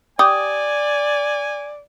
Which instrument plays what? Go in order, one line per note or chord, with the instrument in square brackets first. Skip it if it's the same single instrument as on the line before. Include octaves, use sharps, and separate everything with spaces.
[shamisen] G4 [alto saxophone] D5 [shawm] G#5 [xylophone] D#6